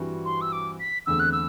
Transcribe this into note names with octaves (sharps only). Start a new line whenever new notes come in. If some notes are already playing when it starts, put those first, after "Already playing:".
Already playing: G2 E3 G3 C4 F#4
C6
E6
D6
B6
E2 D3 A3 C4 E6
F#6
E6